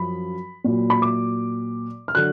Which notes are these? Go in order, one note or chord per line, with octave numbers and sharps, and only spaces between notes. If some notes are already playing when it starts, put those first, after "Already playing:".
Already playing: F#2 F3 B5
A#2 F#3
B5
D6
F6
D3 F#3 F#6